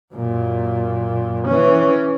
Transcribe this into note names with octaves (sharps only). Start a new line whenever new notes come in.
F#2 A#2
E3 C#4